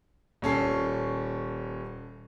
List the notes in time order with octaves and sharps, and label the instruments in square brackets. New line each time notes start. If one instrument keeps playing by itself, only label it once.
[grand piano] D#1 C#4 A4 C7